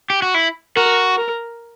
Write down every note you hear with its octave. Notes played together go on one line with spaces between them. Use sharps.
G4
F#4
E4
F#4 A#4
A#4